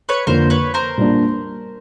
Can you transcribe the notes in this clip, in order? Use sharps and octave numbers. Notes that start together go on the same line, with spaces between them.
B4 C#5
F2 D3 F3 A#3 A#4 C5
B4 C#5
A#4 C5
A#2 G3 A#3 D4